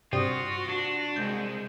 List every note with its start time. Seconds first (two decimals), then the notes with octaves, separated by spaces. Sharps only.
0.13 G2 C3 F4 F#4 D#6
0.69 D4
1.16 C2 G#3 G6